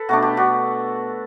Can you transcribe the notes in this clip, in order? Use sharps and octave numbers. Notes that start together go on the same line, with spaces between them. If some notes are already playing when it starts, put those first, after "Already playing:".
Already playing: A4 B4
B2 A3 D4 F#4
G4
D4 F#4